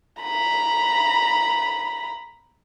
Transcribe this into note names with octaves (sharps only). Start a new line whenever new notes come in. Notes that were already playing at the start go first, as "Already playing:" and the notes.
A#5 B5